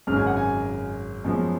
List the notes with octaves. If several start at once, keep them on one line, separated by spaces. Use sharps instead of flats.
G#1 F#2 C#3 G#3 F6
G#5
F#5
G#5
F#2 F3 G#3 B3